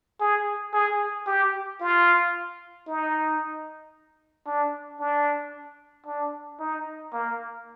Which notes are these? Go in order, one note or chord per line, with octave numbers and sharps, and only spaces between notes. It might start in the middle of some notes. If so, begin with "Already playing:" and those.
G#4
G#4
G4
F4
D#4
D4
D4
D4
D#4
A#3